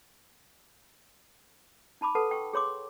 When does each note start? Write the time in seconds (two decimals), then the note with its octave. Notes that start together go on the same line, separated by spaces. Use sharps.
2.01 D#4 A5 B5 D6
2.15 A4 B4 F#5 A5
2.31 G5 C#6
2.53 G#4 C#5 C6 D6